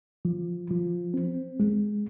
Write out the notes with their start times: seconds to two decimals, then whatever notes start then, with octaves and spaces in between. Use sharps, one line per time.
0.25 F3
0.70 F3
1.14 C4
1.60 G#3